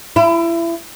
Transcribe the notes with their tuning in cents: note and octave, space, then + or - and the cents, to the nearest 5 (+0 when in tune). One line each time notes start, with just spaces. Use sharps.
E4 +30